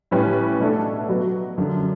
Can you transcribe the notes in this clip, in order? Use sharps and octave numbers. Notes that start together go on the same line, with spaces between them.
A2 G3 C#4 G4 B4
B2 A3 D4 A4
F#3 B3 F#4 B4
F#2 D3 F#3